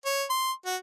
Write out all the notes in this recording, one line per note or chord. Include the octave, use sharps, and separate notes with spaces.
C#5
C6
F#4